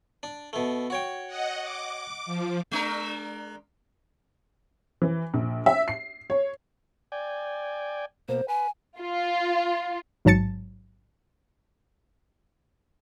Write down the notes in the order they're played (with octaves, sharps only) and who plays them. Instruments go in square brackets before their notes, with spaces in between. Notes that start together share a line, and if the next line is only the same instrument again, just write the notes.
[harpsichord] D4
B2 A3
F#4 C#5 G5
[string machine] D#5 F#5
D6
F3
[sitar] G#3 D4 A#4
[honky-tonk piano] E3
A#1
E5
C7
C#5
[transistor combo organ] D5 G5 G#5
[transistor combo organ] B2 A#3 [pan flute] C5
[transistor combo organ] B4 [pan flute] G#5
[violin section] F4
[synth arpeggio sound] A1 G#2 F#3 A5 A6 C#7